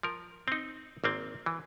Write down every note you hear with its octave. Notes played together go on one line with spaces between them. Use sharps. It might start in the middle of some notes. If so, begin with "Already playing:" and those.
F3 A#4
C4 D#4
G#1 A#3 C4
E3